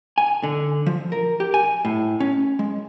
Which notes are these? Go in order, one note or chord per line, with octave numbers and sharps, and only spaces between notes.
G#5
D3
F3
A#4
G4
G#5
A2
C#4
G#3